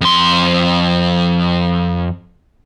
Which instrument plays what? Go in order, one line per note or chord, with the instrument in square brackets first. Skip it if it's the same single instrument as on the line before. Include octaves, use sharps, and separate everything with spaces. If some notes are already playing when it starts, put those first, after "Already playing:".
[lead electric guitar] F2 C6